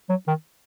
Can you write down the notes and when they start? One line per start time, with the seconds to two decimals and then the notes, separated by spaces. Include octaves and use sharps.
0.09 F#3
0.28 D#3